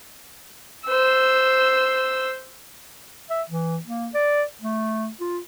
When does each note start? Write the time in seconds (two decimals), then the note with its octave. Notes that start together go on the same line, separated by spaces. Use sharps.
0.87 C5 E6
3.30 E5
3.49 E3
3.86 A#3
4.14 D5
4.62 A3
5.20 F4